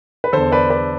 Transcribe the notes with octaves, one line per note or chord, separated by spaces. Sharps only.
B4
E2 D3 A4 C5
B4 D5
B4 D5